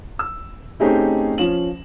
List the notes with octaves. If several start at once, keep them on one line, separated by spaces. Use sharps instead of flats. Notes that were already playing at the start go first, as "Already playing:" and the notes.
E6
A3 C4 C#4 D#4 G4 G#4
F3 C#4 E7 F#7